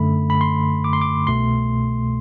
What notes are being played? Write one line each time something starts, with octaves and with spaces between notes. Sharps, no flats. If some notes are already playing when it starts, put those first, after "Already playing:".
Already playing: F#2 D3 A3 B5
B5
C6
D6
C6
D6
C2 B2 A3 C6